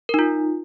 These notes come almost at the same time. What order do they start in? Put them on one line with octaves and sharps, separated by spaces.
A#4 D#4 F4